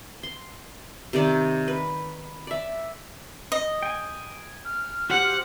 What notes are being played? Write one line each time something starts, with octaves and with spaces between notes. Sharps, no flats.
C6
C3 D#3 D5
B4
D5 E5
D#5
G5 G#5
F6
F#4 G4 C5 F#5